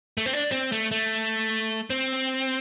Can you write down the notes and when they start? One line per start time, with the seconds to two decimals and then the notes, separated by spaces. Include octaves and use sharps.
0.18 A3
0.26 C4
0.33 D4
0.52 C4
0.72 A3
0.91 A3
1.90 C4